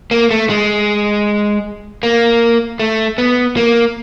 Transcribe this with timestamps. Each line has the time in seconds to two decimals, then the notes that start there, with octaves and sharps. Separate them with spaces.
0.11 A#3
0.31 A3
0.50 G#3
2.03 A#3
2.79 A3
3.18 B3
3.57 A#3